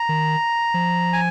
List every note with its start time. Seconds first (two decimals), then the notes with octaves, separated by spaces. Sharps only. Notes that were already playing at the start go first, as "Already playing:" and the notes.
Already playing: A#5
0.09 D#3
0.74 F3
1.13 G#5